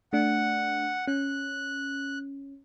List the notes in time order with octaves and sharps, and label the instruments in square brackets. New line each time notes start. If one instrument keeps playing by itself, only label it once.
[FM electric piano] A3 D4 [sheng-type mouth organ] F#5
[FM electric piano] C#4 [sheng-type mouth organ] F#6